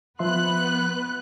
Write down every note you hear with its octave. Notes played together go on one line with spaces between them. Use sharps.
F3 B3 B4 E5 C6 F#6